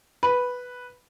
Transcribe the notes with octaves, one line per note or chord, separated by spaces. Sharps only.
B4